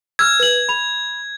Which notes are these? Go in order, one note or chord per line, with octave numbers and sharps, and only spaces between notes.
E6 F6 G#6
B4 F#7
B5 F7